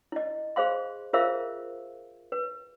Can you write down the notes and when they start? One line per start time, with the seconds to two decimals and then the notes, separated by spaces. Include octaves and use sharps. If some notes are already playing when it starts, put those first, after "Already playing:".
0.12 E4 D#5
0.56 G#4 C5 F5 C6
1.13 F4 G#4 A#4 C5 E5 F5
2.32 B4